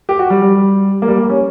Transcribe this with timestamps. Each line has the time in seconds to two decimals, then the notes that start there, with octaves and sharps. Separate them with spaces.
0.09 G4
0.19 F#4
0.30 G3
0.42 G3
1.02 A#3
1.08 G3
1.18 A#3
1.30 C#4